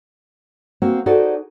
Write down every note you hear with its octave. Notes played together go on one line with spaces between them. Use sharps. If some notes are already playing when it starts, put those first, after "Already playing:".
A#3 C4 F#4
D#4 F#4 G#4 A4 C5 D5